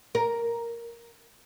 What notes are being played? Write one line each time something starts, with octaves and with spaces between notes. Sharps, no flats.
A#4